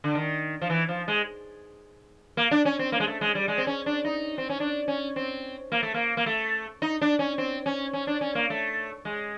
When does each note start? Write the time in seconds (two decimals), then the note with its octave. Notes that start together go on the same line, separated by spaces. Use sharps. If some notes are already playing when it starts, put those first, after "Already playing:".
0.04 D3
0.15 D#3
0.62 F3
0.70 E3
0.89 F3
1.08 G#3
2.37 A#3
2.51 D4
2.65 C#4
2.79 C4
2.92 A#3
3.00 G#3
3.07 A3
3.21 G#3
3.35 G3
3.48 G#3
3.58 C4
3.67 C#4
3.86 D4
4.04 D#4
4.38 C4
4.49 C#4
4.60 D4
4.88 C#4
5.16 C4
5.72 A#3
5.83 A3
5.94 A#3
6.17 A#3
6.26 A3
6.82 D#4
7.01 D4
7.19 C#4
7.38 C4
7.66 C#4
7.93 C#4
8.07 D4
8.21 C#4
8.35 A#3
8.50 A3
9.05 G#3